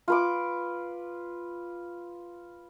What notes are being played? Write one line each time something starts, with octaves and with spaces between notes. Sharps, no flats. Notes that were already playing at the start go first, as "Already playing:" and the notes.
F4 B4 D6